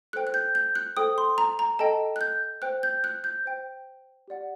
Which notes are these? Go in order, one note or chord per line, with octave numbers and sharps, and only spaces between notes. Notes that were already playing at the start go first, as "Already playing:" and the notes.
A4 C5 G5 F#6
F#6
G6
G6
F#6
A4 C5 G5 D#6
C6
A#5
A#5
A4 D#5 G5 A5
F#6
G6
C5 G5 F#6
G6
F#6
G6
C5 G5
G4 D5 F#5